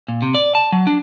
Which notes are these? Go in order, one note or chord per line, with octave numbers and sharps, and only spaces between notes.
A#2
C3
D5
A5
F#3
D4